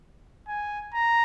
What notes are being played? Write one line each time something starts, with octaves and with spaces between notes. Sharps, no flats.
G#5
A#5